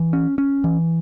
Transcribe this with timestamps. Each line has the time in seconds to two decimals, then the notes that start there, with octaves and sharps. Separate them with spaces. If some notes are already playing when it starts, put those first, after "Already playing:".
Already playing: E3
0.13 C#4
0.38 C#4
0.64 E3